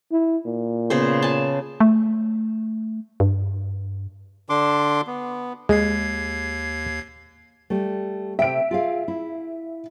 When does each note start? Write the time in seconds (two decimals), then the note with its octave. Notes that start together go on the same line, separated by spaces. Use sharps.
0.12 E4
0.46 A#2
0.90 C#3 B3 C5
1.22 G#5 A5
1.80 A3
3.20 G2
4.49 D3 D4 C6 D6
5.07 B3
5.69 D#2 G#3 G#6 C7
7.70 G3 A3
8.39 C3 E5 G5 D7
8.71 F4 G#4 F5
9.08 E4